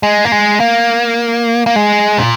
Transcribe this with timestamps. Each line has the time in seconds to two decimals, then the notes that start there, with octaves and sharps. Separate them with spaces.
0.03 G#3
0.25 A#3
0.32 G#3
0.60 A#3
1.66 A#3
1.76 G#3
2.18 A#2